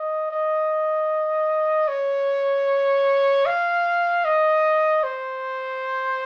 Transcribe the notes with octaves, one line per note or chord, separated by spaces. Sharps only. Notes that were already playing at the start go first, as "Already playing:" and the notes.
Already playing: D#5
D#5
C#5
F5
D#5
C5